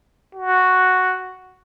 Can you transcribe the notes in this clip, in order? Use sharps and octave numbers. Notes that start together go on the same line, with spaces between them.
F#4